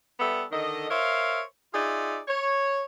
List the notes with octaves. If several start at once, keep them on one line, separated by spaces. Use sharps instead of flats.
G3 B3 A4 E5
D3 D#3 A4 D#5
A#4 C5 C#5 E5 F5
D#4 F4 G#4 D5 E5
C#5